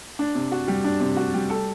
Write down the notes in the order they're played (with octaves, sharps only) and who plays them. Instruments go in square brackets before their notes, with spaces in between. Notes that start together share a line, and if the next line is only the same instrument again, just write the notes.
[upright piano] D4
C3
F#4
G3
D4
C3
F#4
G3
A4